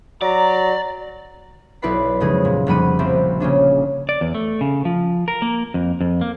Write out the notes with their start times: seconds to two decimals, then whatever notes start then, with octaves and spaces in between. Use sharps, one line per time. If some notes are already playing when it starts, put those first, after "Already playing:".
0.22 F#3 D5 A#5
1.82 B1 E4 B4 D5 B5 C7
2.20 F1 C#3 G#3 G#4
2.45 A#2
2.66 F1 G3 A#3 F#5 B5 D#7
2.99 A#1 C4 E5
3.40 C#3 A#3 C#4 D4
4.09 D5
4.21 E2
4.35 A3
4.61 C#3
4.85 F3
5.28 A#4
5.42 A#3
5.74 F2
6.01 F2
6.21 A#3